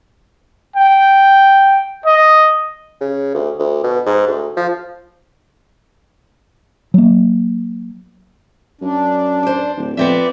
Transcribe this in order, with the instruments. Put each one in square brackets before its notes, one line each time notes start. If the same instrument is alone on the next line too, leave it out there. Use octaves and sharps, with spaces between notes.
[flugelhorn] G5
D#5
[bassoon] C#3
D2
D2
B2
G#2
D2
F3
[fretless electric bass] F#3 A#3
[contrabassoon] F#2 [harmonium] D4
[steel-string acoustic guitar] C5 D5
[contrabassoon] D1
[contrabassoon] F2 [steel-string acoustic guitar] B3 C4 E5 [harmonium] D5